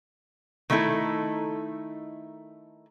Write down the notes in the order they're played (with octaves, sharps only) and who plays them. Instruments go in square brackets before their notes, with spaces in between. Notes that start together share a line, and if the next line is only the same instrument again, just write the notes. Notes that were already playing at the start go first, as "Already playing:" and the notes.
[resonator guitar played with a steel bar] D#3 A3 D#4 E4 A4